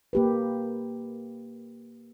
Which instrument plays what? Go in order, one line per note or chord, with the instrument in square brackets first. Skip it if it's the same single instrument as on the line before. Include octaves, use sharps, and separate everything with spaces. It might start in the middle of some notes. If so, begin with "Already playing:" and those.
[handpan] A#3 G4 B4